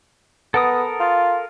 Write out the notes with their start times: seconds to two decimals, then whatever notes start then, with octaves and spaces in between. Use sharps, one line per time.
0.54 B3 A4 A#4 D#6
1.00 F4